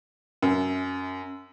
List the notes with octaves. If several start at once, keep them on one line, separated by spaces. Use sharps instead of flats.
F#2